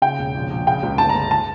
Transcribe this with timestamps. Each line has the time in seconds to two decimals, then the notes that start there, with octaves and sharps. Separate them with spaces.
0.02 C#3 G5
0.19 E1
0.35 A#1
0.50 A#1
0.67 C#3 G5
0.83 C#2
0.98 G1 A5
1.09 A#5
1.15 G1
1.31 A5